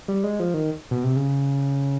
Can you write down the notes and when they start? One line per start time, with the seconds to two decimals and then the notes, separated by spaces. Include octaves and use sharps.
0.08 G3
0.24 G#3
0.40 F3
0.54 D#3
0.91 B2
1.04 C3
1.16 C#3